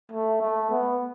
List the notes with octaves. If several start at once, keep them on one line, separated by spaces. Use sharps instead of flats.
A3
A3
B3